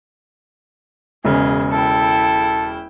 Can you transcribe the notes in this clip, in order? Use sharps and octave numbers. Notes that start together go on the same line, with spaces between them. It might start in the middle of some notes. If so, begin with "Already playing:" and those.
E1 C#3 G#4 D#5
E4 A4 G5